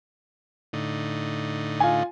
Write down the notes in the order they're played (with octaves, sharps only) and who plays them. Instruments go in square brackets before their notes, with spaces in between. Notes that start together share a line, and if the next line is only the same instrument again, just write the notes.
[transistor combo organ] A2 D3 D#4
[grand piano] F4 G#5